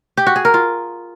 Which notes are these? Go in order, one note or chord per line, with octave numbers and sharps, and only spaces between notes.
G4
F#4
G#4
A#4
F4